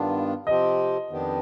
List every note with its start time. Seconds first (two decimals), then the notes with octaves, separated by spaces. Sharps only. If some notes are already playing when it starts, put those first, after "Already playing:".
Already playing: G2 D#3 B3 D4 F4
0.46 C3 F3 C4 G4 D#5
1.10 F2 D#3 B3 D4 G4